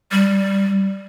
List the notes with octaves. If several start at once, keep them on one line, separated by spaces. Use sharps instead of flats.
G3